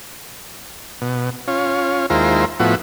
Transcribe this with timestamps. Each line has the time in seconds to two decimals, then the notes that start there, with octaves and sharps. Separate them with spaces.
1.01 B2
1.47 C#4 F4
2.10 D#2 G#3 E4 F4 A#4 C5
2.60 A2 F3 B3 E4 F#4